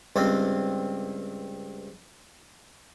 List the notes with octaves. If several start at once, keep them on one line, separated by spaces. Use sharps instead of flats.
C#2 G2 C4